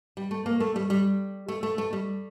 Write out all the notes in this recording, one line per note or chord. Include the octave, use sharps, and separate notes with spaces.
G3
A3
A#3
A3
G3
G3
A3
A3
A3
G3